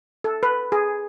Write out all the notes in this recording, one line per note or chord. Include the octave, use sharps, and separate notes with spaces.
A4
B4
G#4